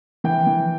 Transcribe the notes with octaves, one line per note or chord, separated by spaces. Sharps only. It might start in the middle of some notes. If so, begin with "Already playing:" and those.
E3 G5
E3